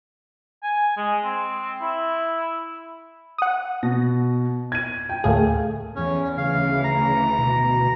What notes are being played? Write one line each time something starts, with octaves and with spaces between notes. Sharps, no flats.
G#5
G#3
C4
E4
F#5 D#6
B2 A#6
G#6 D#7
G5
D2 A2 A3 G#4 F5
E2 C#4
D2 C#3 E3 F5
A#5
B2